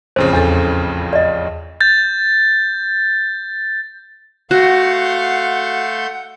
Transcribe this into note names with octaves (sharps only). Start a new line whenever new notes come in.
A1 F2 C#3 C5
E2 A4 A6
D5 D#5
G6 A6
A3 F#4 F5 F#5 C6 G6